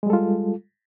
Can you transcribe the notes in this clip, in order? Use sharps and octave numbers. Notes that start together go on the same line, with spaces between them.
G3 G#3 F4 A4